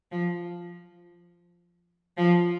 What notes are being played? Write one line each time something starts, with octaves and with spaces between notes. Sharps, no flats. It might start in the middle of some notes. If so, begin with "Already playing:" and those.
F3
F3